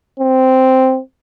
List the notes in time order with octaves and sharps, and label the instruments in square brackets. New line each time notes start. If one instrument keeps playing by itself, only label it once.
[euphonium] C4